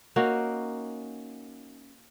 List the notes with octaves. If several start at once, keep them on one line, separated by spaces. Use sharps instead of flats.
A#3 C#4 D#4 F#4